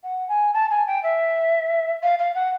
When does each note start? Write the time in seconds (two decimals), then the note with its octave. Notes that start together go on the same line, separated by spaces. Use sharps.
0.03 F#5
0.28 G#5
0.53 A5
0.70 G#5
0.87 G5
1.03 E5
2.02 F5
2.19 F5
2.35 F#5